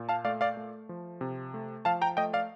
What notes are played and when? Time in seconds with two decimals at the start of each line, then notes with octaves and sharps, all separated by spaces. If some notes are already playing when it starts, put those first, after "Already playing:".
Already playing: A#2
0.09 F5 A5
0.25 A3 D5 F5
0.41 D5 F5
0.57 A3
0.89 F3
1.21 C3
1.54 A3
1.85 F3 F5 A5
2.01 G5 A#5
2.17 A3 D#5 G5
2.33 D5 F5